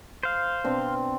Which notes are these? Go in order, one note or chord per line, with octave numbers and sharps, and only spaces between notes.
C5 F5
B2 C4 D4